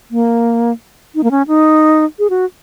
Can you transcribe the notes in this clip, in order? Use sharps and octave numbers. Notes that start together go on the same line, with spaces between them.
A#3
D#4
A#3
C#4
D#4
G#4
F#4